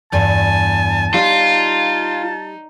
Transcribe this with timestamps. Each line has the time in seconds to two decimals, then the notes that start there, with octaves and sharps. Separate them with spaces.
0.12 E2 G2 G#5 A5
1.14 G3 D#4 F4